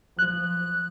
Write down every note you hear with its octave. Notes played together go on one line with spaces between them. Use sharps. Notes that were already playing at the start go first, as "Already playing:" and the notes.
F3 F#6